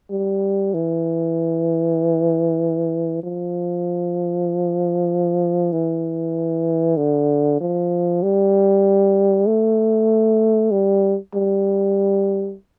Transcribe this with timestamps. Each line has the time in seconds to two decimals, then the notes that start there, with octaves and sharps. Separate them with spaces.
0.11 G3
0.74 E3
3.23 F3
5.72 E3
6.97 D3
7.61 F3
8.23 G3
9.47 A3
10.71 G3
11.34 G3